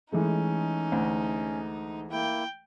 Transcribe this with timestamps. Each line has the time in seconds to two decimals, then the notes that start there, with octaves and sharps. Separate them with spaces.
0.12 E3 G#3 A3 C#4 D#4
0.92 D2
2.11 A#3 E4 G5